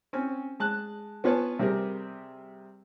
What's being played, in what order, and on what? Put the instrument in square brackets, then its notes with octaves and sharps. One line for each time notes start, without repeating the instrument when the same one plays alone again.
[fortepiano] C4 C#4 G#5
G#3 A5 F#6
B3 F4 B4 C#5 G#5 A5
C3 G3 C4 G4 G#4 A#4